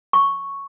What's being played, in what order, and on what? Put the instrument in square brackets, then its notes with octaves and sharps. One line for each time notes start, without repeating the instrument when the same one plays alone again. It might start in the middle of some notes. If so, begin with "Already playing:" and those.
[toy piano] C#6